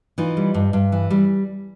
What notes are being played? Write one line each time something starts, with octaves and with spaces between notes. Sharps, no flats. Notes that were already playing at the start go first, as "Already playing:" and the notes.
E3 D#4 F4
G3
G2
G2
E3
G3